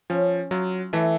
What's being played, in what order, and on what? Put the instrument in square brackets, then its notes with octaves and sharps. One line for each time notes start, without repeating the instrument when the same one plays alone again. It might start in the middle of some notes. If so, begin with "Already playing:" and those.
[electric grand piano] F3 [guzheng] C#4
[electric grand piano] F#3 [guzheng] F4
[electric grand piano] E3 [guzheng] A3